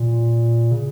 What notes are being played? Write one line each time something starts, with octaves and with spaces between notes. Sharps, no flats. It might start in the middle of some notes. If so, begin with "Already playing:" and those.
Already playing: A#2
C#3